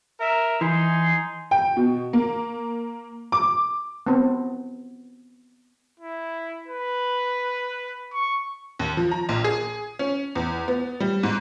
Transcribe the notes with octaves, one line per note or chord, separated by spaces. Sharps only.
A#4 E5
E3 D#4 G#5 C6
G5
B2
A#3
D6
B3 C4
E4
B4
C#6
D#2
F3
A#5
A#1
G#4
C#4
E2
B3
G3
G#2